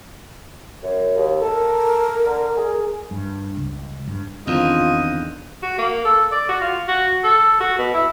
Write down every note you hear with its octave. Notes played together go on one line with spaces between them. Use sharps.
F#2
D#2
A4 A#4
D3
G#4
G2
C#2
G2
E2 D3 D#3 C4 F4 D#5
F#4
A#3
A4
D5
F#4
F4
F#4
A4
F#4
B2
E4